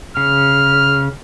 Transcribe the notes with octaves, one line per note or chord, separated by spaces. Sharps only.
C#3 F6